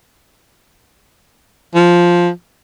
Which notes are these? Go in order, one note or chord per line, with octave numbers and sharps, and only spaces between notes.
F3